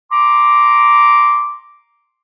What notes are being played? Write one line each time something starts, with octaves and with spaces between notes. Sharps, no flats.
A#5 C6 D6